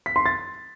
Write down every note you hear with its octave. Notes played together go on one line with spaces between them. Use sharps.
B6
C6
A6